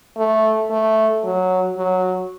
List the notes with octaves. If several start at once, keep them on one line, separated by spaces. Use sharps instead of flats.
A3
A3
F#3
F#3